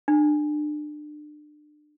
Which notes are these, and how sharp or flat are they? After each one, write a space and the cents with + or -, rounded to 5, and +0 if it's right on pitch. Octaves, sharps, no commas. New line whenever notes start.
D4 +30